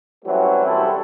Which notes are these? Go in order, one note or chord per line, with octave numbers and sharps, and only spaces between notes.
E3 F#3 G3 A3 C4 C#4
C2 C3 C4 E4 F#4 A4